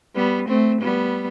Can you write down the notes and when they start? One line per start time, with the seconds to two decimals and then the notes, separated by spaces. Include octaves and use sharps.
0.16 G3 B3
0.48 A3 C4
0.81 G3 B3